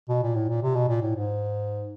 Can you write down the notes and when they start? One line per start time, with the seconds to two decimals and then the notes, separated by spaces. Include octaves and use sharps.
0.09 B2
0.23 A#2
0.35 A2
0.49 A#2
0.62 C3
0.75 B2
0.89 A#2
1.02 A2
1.16 G#2